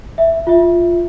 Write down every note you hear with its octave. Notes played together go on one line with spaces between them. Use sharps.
E5
F4 E5